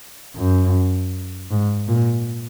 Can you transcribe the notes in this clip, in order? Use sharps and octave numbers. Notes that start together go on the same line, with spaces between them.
F#2
G#2
A#2